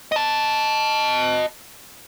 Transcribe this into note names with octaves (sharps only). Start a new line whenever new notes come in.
D#5 A5